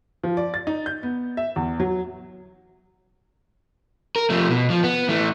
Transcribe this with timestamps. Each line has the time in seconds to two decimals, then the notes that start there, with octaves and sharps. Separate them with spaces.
0.24 F3
0.37 D5
0.54 A6
0.67 D#4
0.86 G6
1.03 B3
1.37 E5
1.56 E2
1.80 F#3
4.16 A#4
4.30 F3 A3
4.50 B2
4.70 F3
4.84 B3
5.08 E3 A3